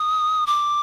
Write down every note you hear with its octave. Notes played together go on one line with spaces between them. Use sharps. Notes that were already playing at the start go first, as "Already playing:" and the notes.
Already playing: D#6
D6